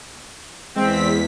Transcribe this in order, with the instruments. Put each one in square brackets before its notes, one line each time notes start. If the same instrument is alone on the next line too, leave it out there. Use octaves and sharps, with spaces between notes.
[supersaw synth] E2 B6 [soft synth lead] G#3 [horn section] C4